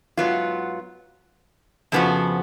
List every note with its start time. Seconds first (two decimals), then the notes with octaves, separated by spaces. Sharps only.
0.17 G#2 F#3 B3 F4
1.92 F2 C#3 F3 B3 F#4